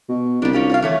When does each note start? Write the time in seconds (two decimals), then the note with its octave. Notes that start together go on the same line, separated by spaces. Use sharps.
0.09 B2
0.42 C2 G3 D4
0.53 C#4 F4 G4
0.69 F4 C#5 F5
0.82 E3 A3 C#5